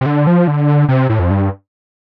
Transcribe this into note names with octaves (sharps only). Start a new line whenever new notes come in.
C3
D3
F3
D3
C3
A2
F2
G2